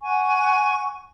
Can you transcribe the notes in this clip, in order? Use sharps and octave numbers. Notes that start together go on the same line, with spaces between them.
F#5 G#5 C#6